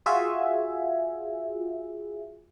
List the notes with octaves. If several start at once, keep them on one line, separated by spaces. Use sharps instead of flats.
F4 F#4 G#4 E5 G#5